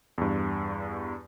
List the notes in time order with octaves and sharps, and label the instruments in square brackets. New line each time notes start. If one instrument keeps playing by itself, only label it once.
[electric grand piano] E2 G2